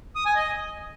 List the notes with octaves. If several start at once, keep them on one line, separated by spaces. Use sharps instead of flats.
D#6
G#5
D#5